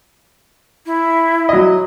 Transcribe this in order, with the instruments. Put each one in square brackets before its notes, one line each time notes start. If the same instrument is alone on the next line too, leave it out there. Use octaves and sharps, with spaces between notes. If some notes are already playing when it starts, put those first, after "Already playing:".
[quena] E4
[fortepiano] F#3 D#5